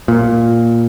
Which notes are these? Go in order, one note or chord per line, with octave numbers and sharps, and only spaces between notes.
A#2